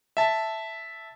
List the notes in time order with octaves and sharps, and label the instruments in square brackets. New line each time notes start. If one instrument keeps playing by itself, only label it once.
[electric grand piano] E5 A5